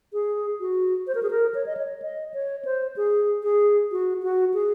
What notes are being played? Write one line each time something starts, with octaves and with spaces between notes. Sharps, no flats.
G#4
F#4
C5
A#4
G#4
A#4
C#5
D#5
C#5
D#5
C#5
C5
G#4
G#4
F#4
F#4
G#4